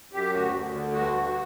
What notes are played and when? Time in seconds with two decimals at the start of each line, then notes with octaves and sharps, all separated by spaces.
0.13 F#2 G4
0.33 D2 F#4
0.53 D2
0.73 D3
0.93 G2 F#4
1.14 G2